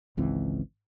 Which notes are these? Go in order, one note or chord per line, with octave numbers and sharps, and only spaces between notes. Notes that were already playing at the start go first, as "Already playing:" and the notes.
G#1 C#2 E3 C4